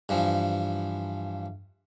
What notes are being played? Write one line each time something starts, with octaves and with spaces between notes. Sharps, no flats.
G2 E3 F3